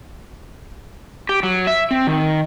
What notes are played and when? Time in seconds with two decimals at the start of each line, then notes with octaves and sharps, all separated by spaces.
1.29 G4
1.43 F#3
1.67 E5
1.91 C4
2.07 D#3